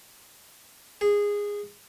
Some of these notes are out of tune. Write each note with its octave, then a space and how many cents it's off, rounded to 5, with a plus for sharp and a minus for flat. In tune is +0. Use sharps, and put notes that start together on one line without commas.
G#4 -15